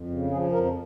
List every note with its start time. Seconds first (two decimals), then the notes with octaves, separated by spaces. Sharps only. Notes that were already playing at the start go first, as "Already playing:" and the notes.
Already playing: F2
0.10 C#3
0.31 F3 G#4
0.53 F2 A#4